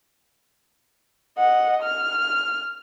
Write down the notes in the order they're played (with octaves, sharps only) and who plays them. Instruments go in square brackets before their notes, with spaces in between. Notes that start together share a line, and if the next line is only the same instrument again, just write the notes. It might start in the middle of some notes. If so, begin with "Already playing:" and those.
[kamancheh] D#5 F#5
F6